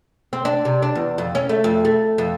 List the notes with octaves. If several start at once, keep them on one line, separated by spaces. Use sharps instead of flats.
C4
D4
C3
D4
E2
F2
C#4
A3
F2
A3
F2